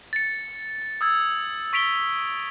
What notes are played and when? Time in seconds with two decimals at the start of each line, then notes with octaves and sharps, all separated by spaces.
0.13 A6 C#7
1.01 D#6 E6 G#6
1.73 C#6 B6 D7 F7 G7